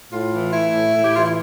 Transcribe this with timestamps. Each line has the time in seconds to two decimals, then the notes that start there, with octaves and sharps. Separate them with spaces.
0.12 A2 F4
0.32 E3
0.53 A3 E4
0.73 A2
0.94 A2
1.04 G4
1.14 E3 F4
1.25 E4